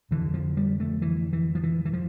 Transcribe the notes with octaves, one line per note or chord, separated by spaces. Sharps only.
F2 D3 E3
F3
G3
A3
E3
E3
F3
E3
E3
F3